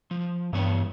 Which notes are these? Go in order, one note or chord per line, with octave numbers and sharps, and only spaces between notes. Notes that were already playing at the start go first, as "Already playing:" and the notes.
F3
G2 E3 B3 C#5